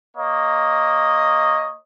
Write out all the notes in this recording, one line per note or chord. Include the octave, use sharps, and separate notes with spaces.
A#3 C#5 D#5